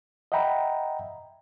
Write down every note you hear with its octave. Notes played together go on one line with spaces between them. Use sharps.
D#5 E5 F#5 G5 A#5 B5